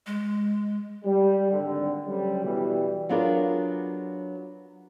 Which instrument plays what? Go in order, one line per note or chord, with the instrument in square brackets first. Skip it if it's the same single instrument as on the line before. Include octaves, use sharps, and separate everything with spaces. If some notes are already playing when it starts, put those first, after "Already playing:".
[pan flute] G#3
[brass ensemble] G3
G#1 D3
D2 C#3 F#3 G3
B2 E3 G3
[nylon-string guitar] F#3 B3 D4 F4 G#4 A#4